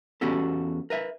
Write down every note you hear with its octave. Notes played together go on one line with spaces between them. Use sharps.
E2 B3 C#4 F#4 G4 A4
A#4 B4 E5